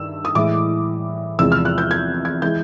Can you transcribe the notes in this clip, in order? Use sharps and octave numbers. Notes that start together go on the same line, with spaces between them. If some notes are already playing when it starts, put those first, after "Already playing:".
Already playing: G2 D#3 E6
D#6
A2 E3 G#3 D6
E2 C3 F3 G#3 E6
F6
F#6
G6
G#6
G#6
E3 G#3 G6